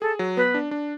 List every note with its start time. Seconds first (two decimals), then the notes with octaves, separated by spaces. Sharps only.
0.01 G#4 A4
0.19 F#3
0.37 B3 B4
0.54 D4
0.71 D4